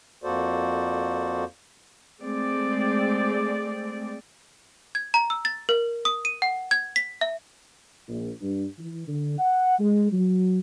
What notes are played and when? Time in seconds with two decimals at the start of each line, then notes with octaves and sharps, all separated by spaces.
0.24 F2 A#3 F#4 A4 C5 D5
2.21 G#3 A3 C4 D5
4.95 G#6
5.14 A#5
5.30 E6
5.45 A6
5.69 A#4
6.05 D#6
6.25 D#7
6.42 F#5
6.71 G#6
6.96 B6
7.21 E5
8.08 A#1
8.41 G2
8.78 E3
9.08 D3
9.38 F#5
9.79 G#3
10.12 F#3